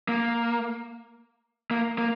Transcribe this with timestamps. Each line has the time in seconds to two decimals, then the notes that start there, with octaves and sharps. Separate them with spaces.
0.08 A#3
1.71 A#3
1.98 A#3